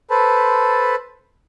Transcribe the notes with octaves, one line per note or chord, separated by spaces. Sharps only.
A4 B4 C5 A5 B5